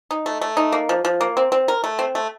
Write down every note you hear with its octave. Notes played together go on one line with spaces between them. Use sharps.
D#4
A3
A3
D#4
A#3
F3
F3
A#3
C4
C4
A#4
A3
C4
A3